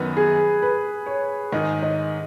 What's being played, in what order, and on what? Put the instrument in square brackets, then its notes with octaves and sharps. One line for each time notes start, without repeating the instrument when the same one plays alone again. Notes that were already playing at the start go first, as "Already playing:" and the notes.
Already playing: [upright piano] F#2 D#3 B3 D#4 [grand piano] B4
[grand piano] G#4
B4
C#5
[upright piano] G#2 D#3 G#3 D#4 [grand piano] D#5
[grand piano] D#5